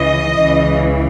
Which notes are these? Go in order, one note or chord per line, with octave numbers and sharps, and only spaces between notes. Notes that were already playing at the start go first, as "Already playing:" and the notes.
Already playing: C#2 C#3 E3 D#5
C#2 C#3 E3